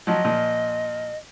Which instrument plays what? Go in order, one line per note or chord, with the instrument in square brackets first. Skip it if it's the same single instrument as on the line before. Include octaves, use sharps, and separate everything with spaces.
[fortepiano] F3 F#3 [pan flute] D#5
[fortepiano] A#2 F3